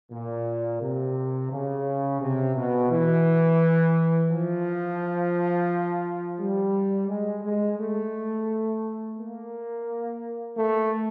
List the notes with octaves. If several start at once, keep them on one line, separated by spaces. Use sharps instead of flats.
A#2
C3
C#3
C3
B2
E3
F3
G3
G#3
G#3
A3
A#3
A3